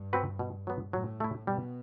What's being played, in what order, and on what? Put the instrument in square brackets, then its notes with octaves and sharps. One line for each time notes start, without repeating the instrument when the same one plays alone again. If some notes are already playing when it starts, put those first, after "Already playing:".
Already playing: [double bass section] G2
[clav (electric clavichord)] C4 F#4 B4
B2
F#3 B3
[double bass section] A2 [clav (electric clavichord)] F#3
[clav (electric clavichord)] A3 E4
[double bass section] B2 [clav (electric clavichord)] G3